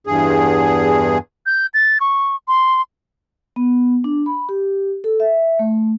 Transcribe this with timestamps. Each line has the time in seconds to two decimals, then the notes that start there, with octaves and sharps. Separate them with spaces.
0.07 E2 G2 G#4
1.46 G6
1.74 A6
2.00 C#6
2.48 C6
3.56 B3
4.04 D4
4.26 B5
4.49 G4
5.04 A4
5.20 E5
5.59 A3